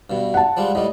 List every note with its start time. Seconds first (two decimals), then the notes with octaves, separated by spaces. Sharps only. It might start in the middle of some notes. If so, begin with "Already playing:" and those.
0.10 G2 B2
0.34 F#5 A5
0.57 F3 G3 G#3
0.75 A2 G3 D#5